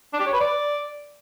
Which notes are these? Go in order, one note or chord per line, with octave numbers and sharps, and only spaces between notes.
D4
G4
C#5
B4
D5